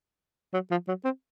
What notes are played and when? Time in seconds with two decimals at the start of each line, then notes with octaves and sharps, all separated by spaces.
0.54 F#3
0.71 F3
0.88 F#3
1.05 C4